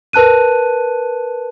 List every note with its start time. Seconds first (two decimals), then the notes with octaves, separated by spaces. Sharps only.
0.13 A#4 B4 A5 F#6 D#7